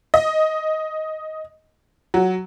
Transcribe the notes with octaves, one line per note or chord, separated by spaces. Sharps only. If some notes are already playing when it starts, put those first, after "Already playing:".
D#5
F#3